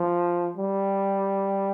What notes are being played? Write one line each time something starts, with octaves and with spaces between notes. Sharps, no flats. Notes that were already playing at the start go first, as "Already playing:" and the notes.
Already playing: F3
G3